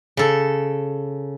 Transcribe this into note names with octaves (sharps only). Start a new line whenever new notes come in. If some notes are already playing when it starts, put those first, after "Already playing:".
C#3 A4